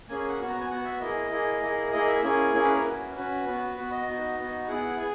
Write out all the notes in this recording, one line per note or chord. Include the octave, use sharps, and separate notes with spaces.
A#3 C#4 G#4 G#5
G#5
F#5
B3 F#4
A#5
G#5
B3 F#4 F#5
E5
A#3 E4 G#4 D#5
A#3 E4 G#4
A#3 E4 G#4
A#3 E4 G#4 D#5
E5
A#3 C#4 E4 G#4 G#5
A#3 C#4 E4 G#4 G#5
B4
A#4
C#4 F#4 B4
C#4 F#4 B4
B3 F#4
B3 F#4 B4
D#5
B3 D#4 F#4
B3 D#4 F#4
B3 E4 G#4 F#5
G#4 G#5